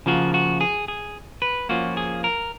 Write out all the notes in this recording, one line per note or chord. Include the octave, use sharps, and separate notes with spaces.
C#3 F3 A#3 F4 F#4
F#4
G#4
G#4
B4
F3 A#3 C#4 F4 F#4
G#4
A#4